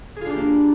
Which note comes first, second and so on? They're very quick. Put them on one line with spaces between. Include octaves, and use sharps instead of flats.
G#4 F4 D4 G4 A#3